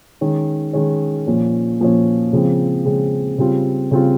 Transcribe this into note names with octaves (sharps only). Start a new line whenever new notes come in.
D#3 G#3 C#4
D#3 G#3 C#4
A#2 F3 A#3 C#4
A#2 F3 A#3 C#4
C#3 F3 G#3 C4
C#3 F3 G#3 C4
C#3 G3 C4 F4
C#3 G3 C4 F4